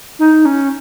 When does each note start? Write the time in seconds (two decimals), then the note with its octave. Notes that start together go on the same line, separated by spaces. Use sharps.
0.19 D#4
0.45 C#4